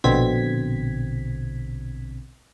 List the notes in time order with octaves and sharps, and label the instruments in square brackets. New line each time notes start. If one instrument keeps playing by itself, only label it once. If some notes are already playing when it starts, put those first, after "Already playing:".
[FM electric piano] A#1 B2 D3 C4 G#6 B6